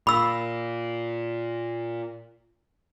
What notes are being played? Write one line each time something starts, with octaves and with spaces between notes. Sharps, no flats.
A#2 B5 E6